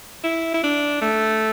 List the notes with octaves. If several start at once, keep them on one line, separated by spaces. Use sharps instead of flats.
E4
E4
D4
A3